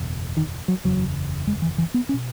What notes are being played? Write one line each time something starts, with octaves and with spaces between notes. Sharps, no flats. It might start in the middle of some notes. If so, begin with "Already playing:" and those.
Already playing: F#1 E2 B2
D#3
F#3
F#1 E2 C#3 F#3
G#3
E3
E3
B3
C#4
B2